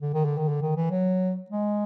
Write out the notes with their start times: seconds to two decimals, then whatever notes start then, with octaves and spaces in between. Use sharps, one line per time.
0.02 D3
0.14 D#3
0.25 D3
0.38 D#3
0.49 D3
0.62 D#3
0.77 E3
0.91 F#3
1.51 G#3